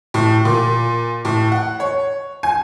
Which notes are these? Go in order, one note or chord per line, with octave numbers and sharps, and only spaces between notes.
A2
A#2
A2
F#5
C#5
G#5